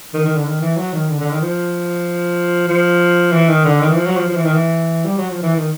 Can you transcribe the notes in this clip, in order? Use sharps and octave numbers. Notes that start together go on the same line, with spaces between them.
D#3
D#3
D3
D#3
E3
F#3
D#3
D3
D3
D#3
F3
F3
E3
D#3
D3
D#3
E3
F3
F#3
F3
F3
E3
D#3
E3
G3
F#3
F3
E3
D#3